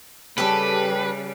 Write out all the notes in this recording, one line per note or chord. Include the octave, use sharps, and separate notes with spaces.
C#3 G3 G4 A4 B4